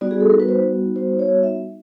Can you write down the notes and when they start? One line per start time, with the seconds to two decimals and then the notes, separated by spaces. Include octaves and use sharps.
0.01 G3 B3 D#4 F#4 D5
0.11 G#4
0.20 A4
0.30 A#4
0.40 B4
0.49 C5
0.96 C5
1.19 C#5
1.43 E5